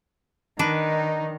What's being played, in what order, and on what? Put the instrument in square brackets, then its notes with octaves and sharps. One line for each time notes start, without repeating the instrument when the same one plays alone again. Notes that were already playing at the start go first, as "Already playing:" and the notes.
[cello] D#3 [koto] D4 B4 [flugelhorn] D#4